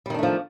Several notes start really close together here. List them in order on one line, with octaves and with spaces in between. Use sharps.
G3 D#3 D4 A3 F3